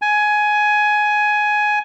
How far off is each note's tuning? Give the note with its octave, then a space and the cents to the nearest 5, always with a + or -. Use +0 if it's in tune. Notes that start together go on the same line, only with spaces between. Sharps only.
G#5 +15